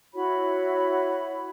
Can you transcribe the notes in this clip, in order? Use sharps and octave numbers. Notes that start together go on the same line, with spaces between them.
E4 F#4 C#5 B5